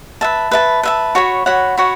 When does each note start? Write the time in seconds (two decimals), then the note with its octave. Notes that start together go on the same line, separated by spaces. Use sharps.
0.21 B4 E5 A5
0.51 B4 E5 A5
0.83 B4 E5 A5
1.15 F#4 C#5 F#5 B5
1.46 F#4 C#5 F#5 B5
1.77 F#4 C#5 F#5 B5